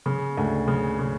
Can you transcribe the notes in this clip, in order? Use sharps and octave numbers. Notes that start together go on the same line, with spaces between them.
C#3
D2
C#3
C#3